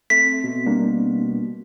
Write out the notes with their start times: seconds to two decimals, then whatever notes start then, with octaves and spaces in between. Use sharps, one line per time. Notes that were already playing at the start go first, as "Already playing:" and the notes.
0.10 A3 C4 B6
0.44 B2
0.66 G3 A#3 D4